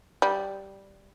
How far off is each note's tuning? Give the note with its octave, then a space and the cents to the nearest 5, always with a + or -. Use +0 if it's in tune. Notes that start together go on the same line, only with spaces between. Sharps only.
G3 -5